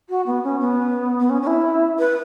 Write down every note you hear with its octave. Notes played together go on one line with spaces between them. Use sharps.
F#4
B3
C#4
B3
B3
C#4
C#4
E4
B4